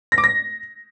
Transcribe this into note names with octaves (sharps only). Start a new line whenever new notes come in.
A#6
D6
A#6